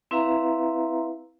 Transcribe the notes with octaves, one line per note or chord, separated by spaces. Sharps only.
C4 E4 B4 E5 F5 A#5